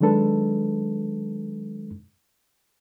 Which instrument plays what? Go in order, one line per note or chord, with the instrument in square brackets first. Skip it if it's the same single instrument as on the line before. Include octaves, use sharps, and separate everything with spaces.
[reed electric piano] D#3 F#3 G#3 D4 A4 B4